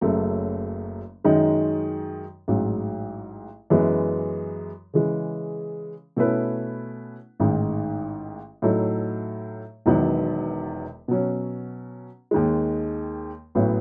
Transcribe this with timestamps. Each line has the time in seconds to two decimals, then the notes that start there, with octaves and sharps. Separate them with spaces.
0.01 F#1 F#2 C#3 F#3 A3
1.24 F#2 D#3 G#3 D#4
2.48 A1 G#2 F#3
3.70 F#2 E3 G#3 B3
4.94 C#3 E3 G#3
6.17 B2 A3 C#4 E4 B4
7.40 A1 G#2 D#3
8.62 A2 F#3 A3 D#4
9.86 E1 E2 D#3 F#3 B3
11.08 B2 F#3 C#4
12.31 D#2 D#3 G#3
13.55 A1 A2 F#3 B3